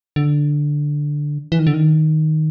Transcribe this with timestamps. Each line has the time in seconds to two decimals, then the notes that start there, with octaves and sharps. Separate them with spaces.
0.16 D3
1.52 E3
1.59 D#3
1.67 D3
1.74 D#3